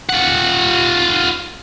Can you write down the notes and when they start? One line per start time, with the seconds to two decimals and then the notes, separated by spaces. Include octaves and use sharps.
0.09 F4 F#5